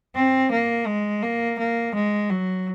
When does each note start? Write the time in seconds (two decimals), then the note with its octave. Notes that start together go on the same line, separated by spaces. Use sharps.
0.15 C4
0.51 A#3
0.87 G#3
1.23 A#3
1.59 A#3
1.95 G#3
2.30 F#3